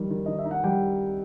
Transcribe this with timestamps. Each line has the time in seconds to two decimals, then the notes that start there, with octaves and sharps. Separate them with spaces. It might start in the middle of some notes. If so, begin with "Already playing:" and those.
Already playing: D#3 G3
0.10 D#3
0.26 D#3 D#5
0.39 E5
0.45 D#4
0.51 F#5
0.64 G3 G4 G5